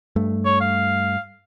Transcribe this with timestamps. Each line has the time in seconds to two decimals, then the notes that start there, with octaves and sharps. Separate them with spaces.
0.16 G2 A3
0.45 C#5
0.60 F5